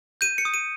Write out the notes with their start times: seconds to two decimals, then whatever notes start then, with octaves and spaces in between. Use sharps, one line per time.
0.21 G6 D#7
0.38 C#7
0.45 D#6
0.54 D#7